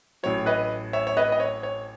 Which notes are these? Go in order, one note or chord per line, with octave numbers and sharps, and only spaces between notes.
A1 A2 F#3 C#5
B4 D#5
C#5 E5
C#5
B4 D#5
D#5
C#5
C#5